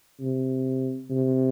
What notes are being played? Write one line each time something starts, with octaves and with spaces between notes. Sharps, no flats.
C3
C3